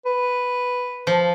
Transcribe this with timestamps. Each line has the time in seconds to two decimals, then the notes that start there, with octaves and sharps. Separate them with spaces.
0.05 B4
1.07 F3